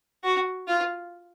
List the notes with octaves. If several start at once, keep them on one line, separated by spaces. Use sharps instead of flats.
F#4
F4